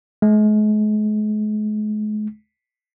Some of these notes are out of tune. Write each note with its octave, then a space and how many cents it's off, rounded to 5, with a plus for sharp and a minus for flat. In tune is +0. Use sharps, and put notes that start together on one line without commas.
G#3 +40